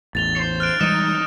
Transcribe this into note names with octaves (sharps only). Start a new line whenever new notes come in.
A1 E2 A6 F7 G7
C5 C#5
F6 F#6 D7
E3 G3 G#3 D#4 D7 E7